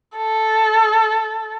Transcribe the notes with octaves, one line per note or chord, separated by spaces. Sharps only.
A4